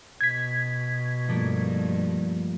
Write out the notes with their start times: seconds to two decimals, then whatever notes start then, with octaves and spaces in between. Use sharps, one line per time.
0.21 B2 G#6 B6
1.29 G2 F3 A3 A#3